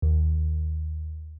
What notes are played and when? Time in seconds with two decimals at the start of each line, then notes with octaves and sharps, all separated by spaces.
0.02 D#2